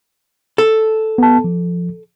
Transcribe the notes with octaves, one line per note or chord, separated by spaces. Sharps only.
A4
B3 A5
F3